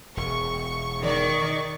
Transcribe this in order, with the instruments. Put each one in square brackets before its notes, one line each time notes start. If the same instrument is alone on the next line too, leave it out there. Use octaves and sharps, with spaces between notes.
[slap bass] E1 [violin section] C#6
[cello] D#3 [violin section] D5 C#6